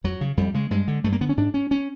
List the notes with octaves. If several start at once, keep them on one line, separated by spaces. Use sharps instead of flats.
F2 F#3
C#3
F2 G3
C#3 G#3
G2 G#3
D3
G2 A3
A#3
D3 B3
C#4
G#2 D4
C#4
C#4